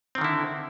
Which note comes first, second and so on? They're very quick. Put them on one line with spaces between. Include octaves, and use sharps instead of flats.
C4 D#3 D3 E4